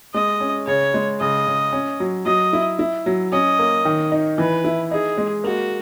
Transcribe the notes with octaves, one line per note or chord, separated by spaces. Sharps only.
G#3 D#5
C#4
C#3 C#5
G#3
C#3 D#5
C#3
C#4
F#3
F#3 D#5
E4
E4
F#3
C#4 D#5
A#3
D#3
D#4
E3 B4
E4
D#4 G#4
G#3
A#3 F#4